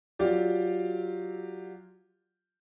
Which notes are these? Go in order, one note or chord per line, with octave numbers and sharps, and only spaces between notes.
F#3 F4 G4 D5